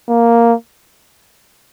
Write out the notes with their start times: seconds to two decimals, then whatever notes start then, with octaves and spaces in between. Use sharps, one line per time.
0.09 A#3